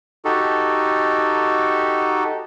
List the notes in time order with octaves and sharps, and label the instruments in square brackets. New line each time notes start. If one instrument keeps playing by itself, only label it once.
[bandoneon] D#4 F#4 G4 A4